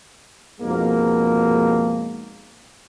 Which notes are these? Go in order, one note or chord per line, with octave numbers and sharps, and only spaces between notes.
F2 G#2 B2 G#3 A#3